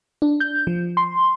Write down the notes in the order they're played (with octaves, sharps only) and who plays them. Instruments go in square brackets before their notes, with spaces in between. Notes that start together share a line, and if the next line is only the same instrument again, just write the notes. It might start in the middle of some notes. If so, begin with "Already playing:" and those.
[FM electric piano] D4
G6
F3
C6